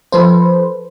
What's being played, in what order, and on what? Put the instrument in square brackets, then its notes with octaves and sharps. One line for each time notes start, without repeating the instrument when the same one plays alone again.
[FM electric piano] F3 A4 B4 C5